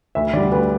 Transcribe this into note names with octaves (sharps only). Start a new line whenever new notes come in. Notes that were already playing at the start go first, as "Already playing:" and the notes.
D2 E5
D3 G3 D5
D2 B4